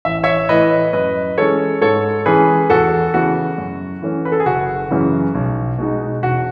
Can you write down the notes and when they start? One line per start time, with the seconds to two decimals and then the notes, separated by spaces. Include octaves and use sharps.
0.05 A1 E5
0.23 C#5 E5
0.49 A2 E3 B4 D#5
0.93 F#2 B4 D#5
1.37 E3 G#3 C#4 A4 C#5
1.82 G#2 A4 C#5
2.26 E3 G#3 C#4 G#4 B4
2.70 E2 F#4 A4
3.14 C#3 E3 B3 F#4
3.58 F#2
4.02 E3 A3 C#4
4.25 B4
4.32 A4
4.40 G#4
4.46 F#1 F#4
4.91 F#2 C#3 E3
5.35 B1
5.79 B2 G#3 D#4
6.23 E1 F#4